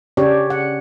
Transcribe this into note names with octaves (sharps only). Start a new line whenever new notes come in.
C#3 C#4 D4 G4 C#5 D5
F#5